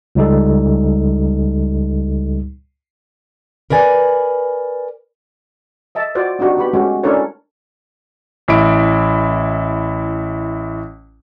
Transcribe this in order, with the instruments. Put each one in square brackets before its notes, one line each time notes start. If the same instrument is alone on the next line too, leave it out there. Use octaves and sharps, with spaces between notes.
[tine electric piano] C#2 G3 D#4 A4
[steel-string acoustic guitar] A#4 B4 D5 G#5
[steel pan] D#5 E5 A5
F4 F#4 C5 D5
C4 D4 D#4 F#4 G4
B3 G4 B5
G#3 A3 C#4 F#4 G4
C#4 D4 E4 A4 A#4 C#5
[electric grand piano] A1 E4 D7